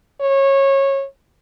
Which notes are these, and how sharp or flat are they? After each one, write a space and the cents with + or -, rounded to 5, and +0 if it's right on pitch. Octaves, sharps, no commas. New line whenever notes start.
C#5 -20